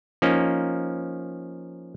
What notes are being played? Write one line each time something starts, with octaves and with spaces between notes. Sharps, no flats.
F3 A#3 C#4 D#4